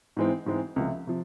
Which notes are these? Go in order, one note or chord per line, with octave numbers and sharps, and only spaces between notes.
G#2 E3 G#3 C4
G#2 E3 G#3 C4
C#2 C3 F3 A3
C3 F3